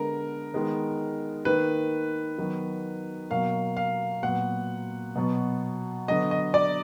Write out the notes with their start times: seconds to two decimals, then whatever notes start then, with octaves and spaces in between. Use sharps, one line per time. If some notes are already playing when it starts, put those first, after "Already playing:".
Already playing: D3 G#3 B3 A#4
0.54 D#3 G#3 B3
1.45 D#3 A#3 B4
2.38 D#3 F#3 B3
3.31 B2 F#3 A#3 F5
3.77 F5
4.23 A#2 F#3 B3 F#5
5.15 B2 F#3 B3
6.08 D3 F#3 B3 D#5
6.31 D#5
6.54 D5